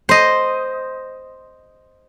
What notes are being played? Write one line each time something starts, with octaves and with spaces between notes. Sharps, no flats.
C5 D#5